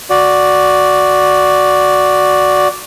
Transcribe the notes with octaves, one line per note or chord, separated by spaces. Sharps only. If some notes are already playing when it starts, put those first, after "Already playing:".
F#4 D5